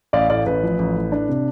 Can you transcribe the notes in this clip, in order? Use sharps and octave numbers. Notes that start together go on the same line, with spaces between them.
A1 D5 F5
A2 D5 F5
A1 B4
F3
A1
A2
D4
C3